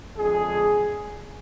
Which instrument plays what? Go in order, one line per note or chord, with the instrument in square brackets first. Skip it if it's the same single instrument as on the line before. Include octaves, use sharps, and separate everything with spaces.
[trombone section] F2 D3 G#3 G#4